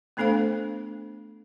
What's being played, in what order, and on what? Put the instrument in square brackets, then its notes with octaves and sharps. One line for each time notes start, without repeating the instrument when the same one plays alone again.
[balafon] A3 B3 D4 A4 C5 F5